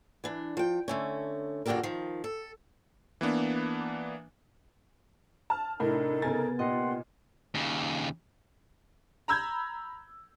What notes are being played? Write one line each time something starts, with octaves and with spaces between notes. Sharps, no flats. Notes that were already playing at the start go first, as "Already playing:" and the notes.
E3 D4
F3 G5
D3 A3 C#4
F#2 A#2 D3 G4 A4 A#4
D#3 F3
A4
E3 A#3 B3 D4
A5 F6
A2 C3 D4 D#4 A4 A#4
C#3 B3 A#4 G#5 A6
A#2 D#4 G4 D#5 F#5 C6
D#2 C#3
A#5 B5 E6 G6 G#6